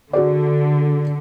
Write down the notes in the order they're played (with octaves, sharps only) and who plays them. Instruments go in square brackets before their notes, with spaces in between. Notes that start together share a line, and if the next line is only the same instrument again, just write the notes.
[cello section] D3 [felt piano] F#4 G#4 D5